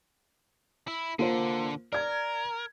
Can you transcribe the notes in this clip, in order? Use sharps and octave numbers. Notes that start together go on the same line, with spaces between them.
E4
D3 A#3 F4 C5
A#4 D5 G#6